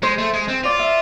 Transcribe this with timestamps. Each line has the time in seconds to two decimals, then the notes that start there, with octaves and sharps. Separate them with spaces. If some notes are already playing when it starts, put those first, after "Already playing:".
0.02 G#3 C5
0.18 A3
0.34 G#3
0.48 C4
0.64 F4 D5
0.79 E5